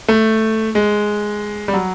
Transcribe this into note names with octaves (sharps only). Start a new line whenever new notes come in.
A3
G#3
G3
F#3